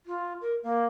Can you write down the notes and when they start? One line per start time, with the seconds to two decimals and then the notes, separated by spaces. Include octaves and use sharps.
0.06 F4
0.41 A#4
0.63 A#3